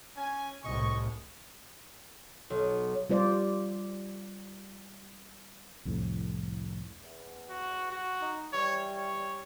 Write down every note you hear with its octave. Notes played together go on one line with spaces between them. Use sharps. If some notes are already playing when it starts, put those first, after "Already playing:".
C#4 G#5
C2 A2 D#5 C#6
B1
G3 F4 C5 D5
C2 F2 A2
E2
F#4
F#4
D#4
E3 G3 C#5
C#5